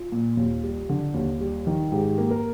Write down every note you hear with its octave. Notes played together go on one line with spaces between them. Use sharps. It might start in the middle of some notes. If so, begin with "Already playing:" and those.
Already playing: F4
A#2
D#2
G3
D3
D#2
G3
D#3
G#2 G4
A#3
A#4